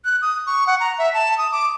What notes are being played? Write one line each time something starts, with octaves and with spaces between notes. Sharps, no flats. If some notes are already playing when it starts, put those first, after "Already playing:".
F#6
D#6
C#6
F#5
A#5
E5
A5
D#6
D6